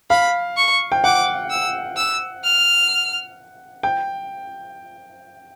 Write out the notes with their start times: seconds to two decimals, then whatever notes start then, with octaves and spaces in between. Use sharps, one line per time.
0.10 F5 B5
0.57 C#6
0.92 G5
1.04 F#5 D6
1.50 E6
1.97 E6
2.43 F6
3.83 G5